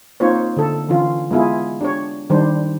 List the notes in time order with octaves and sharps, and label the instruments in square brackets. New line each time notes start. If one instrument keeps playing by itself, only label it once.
[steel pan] A#3 C4 D#4 F4 C5 C#5
D3 A4
D3 E3 C#4 F4
G#3 B3 E4 F4 G#4
D4 G4 C#5
D#3 G3 D4 C5